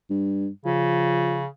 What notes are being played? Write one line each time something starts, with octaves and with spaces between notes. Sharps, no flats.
G2
C#3 F3